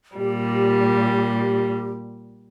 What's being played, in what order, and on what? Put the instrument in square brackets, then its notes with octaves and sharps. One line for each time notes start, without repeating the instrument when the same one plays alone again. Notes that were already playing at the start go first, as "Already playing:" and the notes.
[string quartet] A#2 G3 [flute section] G4